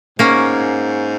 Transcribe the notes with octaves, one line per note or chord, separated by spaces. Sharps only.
G#2 A#3 C#4